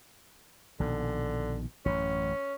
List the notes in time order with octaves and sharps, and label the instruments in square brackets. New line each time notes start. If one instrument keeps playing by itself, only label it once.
[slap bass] A#1 B2 D#3 [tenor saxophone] D3
[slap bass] A1 F#2 [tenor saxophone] C#4